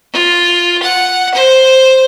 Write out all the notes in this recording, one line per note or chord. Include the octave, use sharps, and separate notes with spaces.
F4
F#5
C5